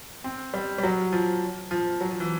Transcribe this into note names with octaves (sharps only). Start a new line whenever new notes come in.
C4
G3
G3
F#3
F3
F3
F#3
F3
E3